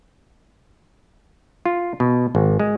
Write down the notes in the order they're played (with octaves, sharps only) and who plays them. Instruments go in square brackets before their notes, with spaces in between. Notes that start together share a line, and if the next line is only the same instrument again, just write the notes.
[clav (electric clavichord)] F4
B2
G#1
G#3